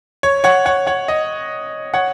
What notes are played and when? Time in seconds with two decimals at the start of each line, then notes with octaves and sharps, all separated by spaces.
0.23 C#5
0.44 C#5 F#5
0.66 C#5 F#5
0.87 C#5 F#5
1.08 D#5
1.94 C#5 F#5